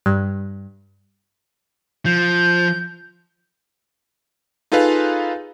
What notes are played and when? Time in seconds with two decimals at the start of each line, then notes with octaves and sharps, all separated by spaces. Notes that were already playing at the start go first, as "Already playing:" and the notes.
0.06 G2
2.06 F3 G6
4.72 D#4 F4 G#4 A4 B4 F5